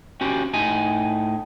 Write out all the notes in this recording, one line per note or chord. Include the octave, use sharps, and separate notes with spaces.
C#4 F#4 G4
A2 D#4 G#5